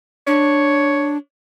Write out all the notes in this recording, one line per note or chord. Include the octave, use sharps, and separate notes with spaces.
D4 C#5